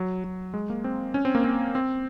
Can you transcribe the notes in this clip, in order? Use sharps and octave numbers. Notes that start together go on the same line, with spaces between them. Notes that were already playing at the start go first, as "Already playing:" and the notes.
Already playing: F#3
F#3
G#3
A#3
C4
C#4
C4
A#3
C4
C4